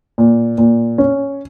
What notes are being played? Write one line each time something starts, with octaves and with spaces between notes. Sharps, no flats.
A#2
A#2
C#4